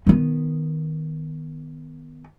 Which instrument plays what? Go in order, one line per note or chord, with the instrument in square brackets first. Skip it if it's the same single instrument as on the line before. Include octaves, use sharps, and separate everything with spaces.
[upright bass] D#3 B3